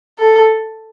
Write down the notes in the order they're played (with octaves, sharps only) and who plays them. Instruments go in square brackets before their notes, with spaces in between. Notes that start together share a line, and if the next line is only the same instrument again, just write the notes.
[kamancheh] A4